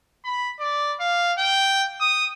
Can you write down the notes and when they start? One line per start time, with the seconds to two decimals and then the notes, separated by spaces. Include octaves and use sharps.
0.24 B5
0.60 D5
1.00 F5
1.38 G5
2.00 D#6